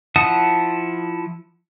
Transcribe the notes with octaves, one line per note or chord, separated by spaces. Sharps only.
F3 E4 F#5 A5 D#6